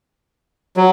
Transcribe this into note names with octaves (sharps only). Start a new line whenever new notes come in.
F#3